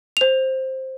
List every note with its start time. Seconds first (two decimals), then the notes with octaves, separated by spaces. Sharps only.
0.17 C5 F7